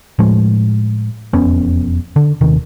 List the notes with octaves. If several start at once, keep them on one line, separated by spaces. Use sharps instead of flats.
A2 F3 G#3
E1 F2 B3 C#4
D3
D#1 C3 D#3